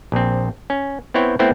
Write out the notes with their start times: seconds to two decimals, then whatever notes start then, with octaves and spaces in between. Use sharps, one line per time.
0.12 A#1 C4
0.70 C#4
1.14 B3 C4 E4 C#5 G5
1.39 A3 B3 C4 E4 C5 G5